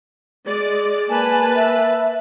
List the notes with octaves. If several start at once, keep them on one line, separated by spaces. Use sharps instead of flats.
G#3 D5
A#3 B4 G#5 A5
E5